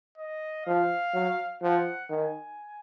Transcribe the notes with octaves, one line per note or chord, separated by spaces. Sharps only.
D#5
F3 F5
F#3
F3 F#5
D#3 G#5